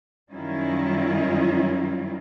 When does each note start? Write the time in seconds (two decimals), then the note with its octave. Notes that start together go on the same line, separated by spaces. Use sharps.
0.33 F#2 D#3 G3 C#4 E4 F4